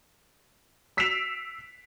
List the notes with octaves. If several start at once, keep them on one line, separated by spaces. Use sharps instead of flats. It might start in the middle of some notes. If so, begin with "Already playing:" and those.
E6 B6 C7 D7 E7 F7